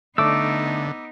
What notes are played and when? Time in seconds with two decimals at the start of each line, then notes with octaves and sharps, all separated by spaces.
0.18 D3 A3 B3 D#4 D5 D6 E6